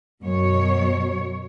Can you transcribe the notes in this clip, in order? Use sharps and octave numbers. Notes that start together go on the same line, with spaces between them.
F#2 B2 C#5